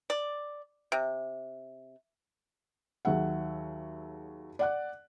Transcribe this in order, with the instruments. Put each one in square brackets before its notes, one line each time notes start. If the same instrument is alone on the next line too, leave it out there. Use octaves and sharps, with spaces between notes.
[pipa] D5
C3
[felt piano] D#2 F#3 G#4 E5 F#5
D5 F#5 F#6